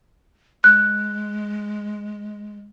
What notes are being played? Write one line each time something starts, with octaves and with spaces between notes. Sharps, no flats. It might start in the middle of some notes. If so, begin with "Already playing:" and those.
G#3 F#6